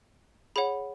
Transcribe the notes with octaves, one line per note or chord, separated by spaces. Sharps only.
G#4 C#5 F#5 B5